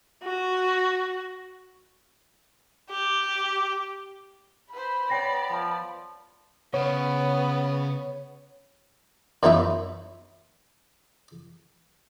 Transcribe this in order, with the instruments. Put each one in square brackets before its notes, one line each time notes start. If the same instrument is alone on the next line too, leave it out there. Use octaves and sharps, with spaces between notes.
[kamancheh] F#4
[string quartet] G4
[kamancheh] B4 C5 [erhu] B5
[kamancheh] B3 D5 [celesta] C#5 G5 A#6
[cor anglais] F3
[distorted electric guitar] C#3 [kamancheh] B3 [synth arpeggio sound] C#5
[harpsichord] F#2 E3 B3 D#4 F4 E5